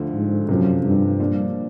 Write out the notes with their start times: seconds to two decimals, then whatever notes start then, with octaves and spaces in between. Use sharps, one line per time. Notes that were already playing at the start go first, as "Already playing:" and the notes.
Already playing: D2 D3 F3
0.14 G#2
0.49 F#2 C3 F3 A3
0.85 G2
1.20 A#2 F3 A#3 D4